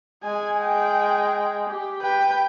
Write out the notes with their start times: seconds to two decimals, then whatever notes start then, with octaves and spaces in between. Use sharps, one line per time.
0.23 G#3 G#5
0.60 G5
1.69 G4
2.02 B4 G5